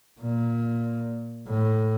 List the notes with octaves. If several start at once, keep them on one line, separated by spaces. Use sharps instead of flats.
A#2
A2